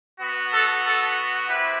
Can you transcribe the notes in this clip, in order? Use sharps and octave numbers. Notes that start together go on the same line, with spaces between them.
B3 F#4
A4
A4
C4 E4 G4 B4